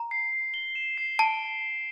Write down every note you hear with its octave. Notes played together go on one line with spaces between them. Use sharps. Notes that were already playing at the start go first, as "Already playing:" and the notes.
Already playing: A#5
C7
C7
G7
E7
C7
A5 D7